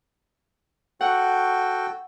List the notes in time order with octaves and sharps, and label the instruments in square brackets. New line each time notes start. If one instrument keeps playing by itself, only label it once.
[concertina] F#4 A4 G5 [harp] F#5